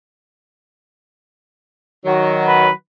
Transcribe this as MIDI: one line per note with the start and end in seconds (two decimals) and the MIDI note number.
2.05 2.67 51
2.05 2.67 54
2.47 2.73 71